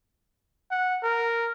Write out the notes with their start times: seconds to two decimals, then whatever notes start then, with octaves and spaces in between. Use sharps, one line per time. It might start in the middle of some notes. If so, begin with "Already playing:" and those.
0.71 F#5
1.03 A#4